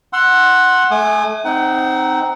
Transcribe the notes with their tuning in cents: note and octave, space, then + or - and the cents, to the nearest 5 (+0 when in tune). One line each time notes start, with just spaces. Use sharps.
F#5 +0 C6 +15 E6 +25
A3 -25 G#5 +0 D#6 -45
C4 +0 D#4 +0 F#5 +30